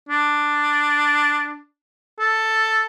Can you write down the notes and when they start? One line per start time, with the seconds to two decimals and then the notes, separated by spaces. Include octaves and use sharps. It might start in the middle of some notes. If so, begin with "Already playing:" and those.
0.09 D4
2.20 A4